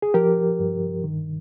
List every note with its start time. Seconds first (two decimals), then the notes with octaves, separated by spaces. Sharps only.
0.02 G#4
0.14 F3 G4 A#4
0.59 G2
1.04 D#3